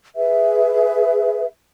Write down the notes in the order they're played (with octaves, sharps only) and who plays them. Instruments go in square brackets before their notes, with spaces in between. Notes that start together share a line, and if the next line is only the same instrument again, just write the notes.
[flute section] G#4 B4 E5